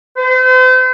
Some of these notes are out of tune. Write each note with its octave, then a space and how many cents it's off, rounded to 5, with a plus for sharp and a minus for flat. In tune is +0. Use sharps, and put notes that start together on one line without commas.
C5 -40